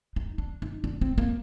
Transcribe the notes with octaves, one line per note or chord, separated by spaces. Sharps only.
D#4
D4
D#4
D4
C4
A#3